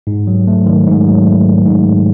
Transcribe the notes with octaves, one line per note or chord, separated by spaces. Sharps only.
G#2
F#3
A3
D#3
G#2
F#3
A3
D#3
G#2
F#3